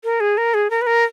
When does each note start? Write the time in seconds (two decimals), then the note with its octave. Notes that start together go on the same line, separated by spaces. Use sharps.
0.04 A#4
0.20 G#4
0.38 A#4
0.54 G#4
0.70 A#4
0.82 B4
0.87 A#4